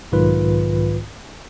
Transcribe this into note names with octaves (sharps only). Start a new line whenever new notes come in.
B1 G#2 D#3 F4 B4